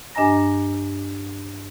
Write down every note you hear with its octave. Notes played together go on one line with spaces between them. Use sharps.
G2 D4 D#5 G#5 A#5 A#6